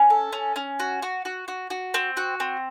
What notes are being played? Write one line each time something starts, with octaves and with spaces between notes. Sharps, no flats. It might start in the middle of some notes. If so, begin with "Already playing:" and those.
Already playing: C#4
A4
C#4
C#4
F#4
F#4
F#4
F#4
F#4
C4
F#4
C4